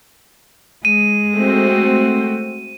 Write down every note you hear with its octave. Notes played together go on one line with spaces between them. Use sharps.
G#3 D#7
A3 C4 F#4